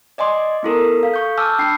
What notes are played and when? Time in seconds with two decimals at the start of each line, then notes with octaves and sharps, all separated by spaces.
0.18 D5 D#5 G#5 C6 D6
0.63 B3 E4 A4 A#4
0.99 A4 F5
1.14 C#6 G6
1.37 G#5 A5 D6 E6 F6 G6
1.59 D4 G5 B5 C7